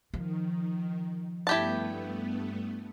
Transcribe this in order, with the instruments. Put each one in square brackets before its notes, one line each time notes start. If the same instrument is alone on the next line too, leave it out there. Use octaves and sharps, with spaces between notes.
[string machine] D#3 [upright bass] F3
[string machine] G2 A3 B3 [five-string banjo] E4 G4 A5